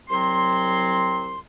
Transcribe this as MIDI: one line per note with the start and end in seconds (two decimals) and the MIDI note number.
0.10 1.39 36
0.10 1.39 54
0.10 1.39 60
0.10 1.39 84